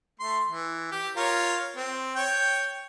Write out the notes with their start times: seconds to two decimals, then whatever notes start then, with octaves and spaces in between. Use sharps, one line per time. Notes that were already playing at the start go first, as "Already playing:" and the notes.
0.20 A3 C6
0.46 E3
0.91 G4
1.16 F4 A#4 C#5
1.77 C4
2.16 C#5 G5